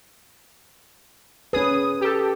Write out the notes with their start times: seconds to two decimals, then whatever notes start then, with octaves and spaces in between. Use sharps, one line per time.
1.53 C#4 G#4 B4 D#6
2.01 G4 A4